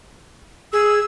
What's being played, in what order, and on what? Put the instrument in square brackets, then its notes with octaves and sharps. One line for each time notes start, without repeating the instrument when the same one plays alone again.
[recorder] G#4 [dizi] E6